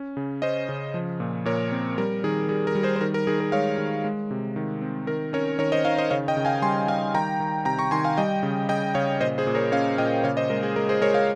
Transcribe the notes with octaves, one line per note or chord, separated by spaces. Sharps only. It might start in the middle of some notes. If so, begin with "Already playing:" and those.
Already playing: C#4
C#3
C#4 C5 D#5
C#3
F3
A#2
A#2 A#4 C#5
C4
G3 A#4
D#3 G#4
G3 G#4
A#4
G3
G#4 C5
C5
D#3 A#4
A#4
D#3 G#4
A#4
G#3 C#5 F5
D#3
G#3
C3
D#3
C4
D#3 A#4
C#4 A#4 C#5
D#3 A#4 C#5
C5 D#5
D#3 C#5 F5
C5 D#5
C#3 C#5 F5
D#5 G5
C#3
F5 G#5
G3 G#5 C6
G3 F5 G#5
D#3 G5 A#5
D#3
C3 G5 A#5
A#5 C#6
D#3 G#5 C6
F5 G#5
G3 D#5 G5
C#3
C#3 D#5 G5
C#3 C#5 F5
A#2 C5 D#5
G#4 C5
A#2
A#4 C#5
C#4 C#5 F5
A#2 D#5 G5
C#3 C#5 F5
C5 D#5
G#3 A#4
G#4
G#3 A#4
G#4 C5
G#3 A#4 C#5
C#5 F5